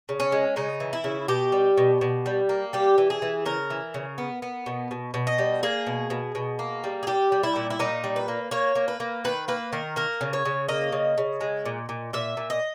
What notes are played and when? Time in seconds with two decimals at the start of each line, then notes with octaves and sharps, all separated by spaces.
0.09 C#3
0.20 C#4
0.32 G#3
0.56 C#3 D#4
0.80 E3
0.93 E4
1.04 C#3
1.28 B2 G4
1.52 G3
1.78 B2
2.01 B2
2.26 G3
2.49 A#3
2.73 G3 G4
2.98 E3
3.10 G#4
3.22 E3
3.45 C#3 A#4
3.70 E3
3.94 C#3
4.18 B3
4.42 B3
4.66 B2
4.91 B2
5.14 B2
5.27 D#5
5.38 G3
5.63 A#3 G#4
5.87 B2
6.10 B2
6.35 B2
6.59 A#3
6.84 G3
7.03 G#4
7.07 G3 G4
7.32 G3
7.43 E4
7.56 A#2
7.70 E4
7.79 A#2 D#4
8.04 G3
8.16 B4
8.28 A#3
8.51 A#3 C#5
8.75 A#3
8.88 B4
9.00 A#3
9.24 D#3 B4
9.48 A#3 B4
9.73 D#3 A#4
9.96 A#3 A#4
10.21 C#3
10.33 C#5
10.45 C#3
10.68 A#3 D#5
10.92 C#3
11.18 C#3
11.41 G#3
11.65 A#2
11.89 A#2
12.13 A#2 E5
12.37 A#2
12.50 D#5